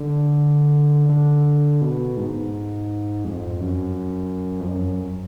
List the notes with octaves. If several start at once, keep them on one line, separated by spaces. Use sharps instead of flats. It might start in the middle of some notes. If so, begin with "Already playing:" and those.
Already playing: D3
D3
B2
G#2
F2
F#2
F2
F#2